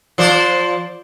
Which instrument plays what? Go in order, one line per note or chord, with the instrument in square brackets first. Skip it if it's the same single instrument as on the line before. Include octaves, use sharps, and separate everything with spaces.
[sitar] F3 C5 D5